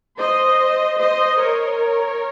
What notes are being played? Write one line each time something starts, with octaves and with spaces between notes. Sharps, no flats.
C5 D#5
C5 D#5
A#4 C#5